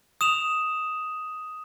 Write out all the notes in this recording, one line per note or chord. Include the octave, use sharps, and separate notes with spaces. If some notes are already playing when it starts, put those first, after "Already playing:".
D#6 E7 F7